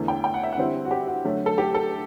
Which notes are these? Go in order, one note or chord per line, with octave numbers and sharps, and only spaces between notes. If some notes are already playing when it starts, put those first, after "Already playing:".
Already playing: E2 D3 A3
G5
G5
F#5
E5
F#5
D3 G3 C4 E4
F#4
G4
F#4
D3 F#3 A3
A4
G4
A4